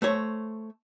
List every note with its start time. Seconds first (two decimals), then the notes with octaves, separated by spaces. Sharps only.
0.02 A3 C5 C#5